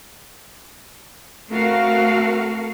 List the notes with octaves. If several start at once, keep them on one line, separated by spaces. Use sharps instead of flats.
A3 C4 F#4 A4 A#4 F5